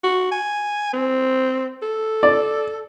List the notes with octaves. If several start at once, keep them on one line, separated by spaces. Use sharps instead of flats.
F#4
G#5
C4
A4
D5